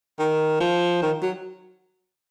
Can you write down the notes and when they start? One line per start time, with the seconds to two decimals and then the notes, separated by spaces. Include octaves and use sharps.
0.19 D#3
0.60 F3
1.02 D#3
1.22 F#3